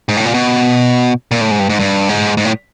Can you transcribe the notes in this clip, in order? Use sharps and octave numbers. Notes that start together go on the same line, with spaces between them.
G#2
A2
A#2
B2
A#2
A2
G#2
G2
G#2
G2
G#2
G#2
A2